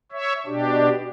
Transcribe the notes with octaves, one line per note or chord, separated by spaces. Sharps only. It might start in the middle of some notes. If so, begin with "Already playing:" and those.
C#5 E5
B2 D4 G4